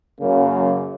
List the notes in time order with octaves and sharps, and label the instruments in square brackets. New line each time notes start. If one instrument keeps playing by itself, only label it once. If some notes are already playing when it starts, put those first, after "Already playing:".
[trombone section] F#2 C#3 F#3 A#3